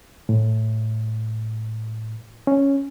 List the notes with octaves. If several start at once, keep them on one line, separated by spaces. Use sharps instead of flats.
A2
C#4